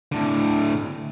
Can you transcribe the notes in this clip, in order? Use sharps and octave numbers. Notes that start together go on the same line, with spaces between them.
A2 D3